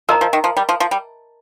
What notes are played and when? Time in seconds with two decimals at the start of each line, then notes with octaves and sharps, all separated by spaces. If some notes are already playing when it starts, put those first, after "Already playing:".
0.09 F3 A#4 D#5 A#5
0.21 F3
0.33 D#3
0.44 F3
0.57 G3
0.69 F3
0.80 F3
0.91 G3